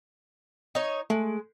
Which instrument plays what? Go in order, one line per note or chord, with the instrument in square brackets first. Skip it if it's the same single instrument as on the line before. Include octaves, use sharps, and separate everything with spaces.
[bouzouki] D#4 C#5
[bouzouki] G#3 [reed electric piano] A3